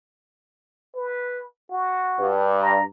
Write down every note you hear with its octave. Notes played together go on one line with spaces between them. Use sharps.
B4
F#4
G2
A#5